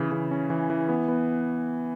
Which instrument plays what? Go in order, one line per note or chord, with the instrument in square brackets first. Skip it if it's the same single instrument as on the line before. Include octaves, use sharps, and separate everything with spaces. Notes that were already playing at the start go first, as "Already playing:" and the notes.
Already playing: [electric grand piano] C#3 E3
C#3
C#4
E3
E3
B3
B3